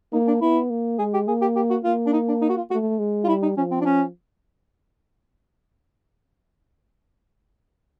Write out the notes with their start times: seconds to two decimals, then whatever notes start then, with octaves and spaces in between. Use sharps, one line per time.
0.13 A#3 D#4
0.27 D4
0.41 B3 E4
0.70 A#3
0.99 G#3 G#4
1.14 G4
1.28 A#3 G#4
1.41 G4
1.56 G4
1.70 F#4
1.84 A#3 F4
2.06 D4
2.13 D#4
2.28 D4
2.42 D#4
2.50 F#4
2.57 F4
2.71 A3 F#4
2.99 G#3
3.24 F4
3.28 G3 E4
3.43 D#4
3.57 F3 C#4
3.71 C4
3.81 D4
3.85 C#4